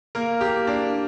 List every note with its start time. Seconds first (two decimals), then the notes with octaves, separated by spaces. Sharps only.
0.15 A#3 A#4
0.41 A#3 G4
0.67 A#3 D4